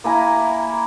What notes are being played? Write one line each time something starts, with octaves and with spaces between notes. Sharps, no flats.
A#3 E4 G#5 A#5